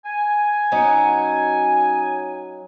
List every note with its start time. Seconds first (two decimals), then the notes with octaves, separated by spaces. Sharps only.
0.05 G#5
0.72 F#3 C#4 D#4